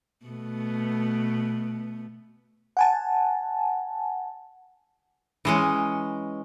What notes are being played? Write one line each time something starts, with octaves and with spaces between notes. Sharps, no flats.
B2 A3 B3
F#5 G#5 A5
E3 G#3 C#4